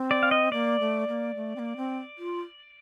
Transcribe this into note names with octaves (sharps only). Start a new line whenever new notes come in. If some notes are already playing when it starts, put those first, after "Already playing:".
Already playing: C4
D5
F5
D#5
A#3 D5
A3
A#3
A3
C4
A#3
C4
F4